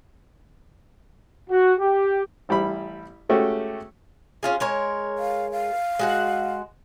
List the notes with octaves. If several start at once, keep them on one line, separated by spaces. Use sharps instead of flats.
F#4
G4
A1 G3 E4 B5
G#3 A3 C#4 F#4 G4
C#4 F4 G#4
G#3 A#4 C#5
F5
F5
G#3 F#4 F#5